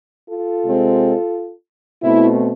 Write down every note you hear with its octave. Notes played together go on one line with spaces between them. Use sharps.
F4 A4
C3 G#3 C4
B2 A3 C4 E4